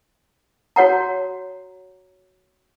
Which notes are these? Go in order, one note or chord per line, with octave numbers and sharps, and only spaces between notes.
F#4 C#5 F#5 A#5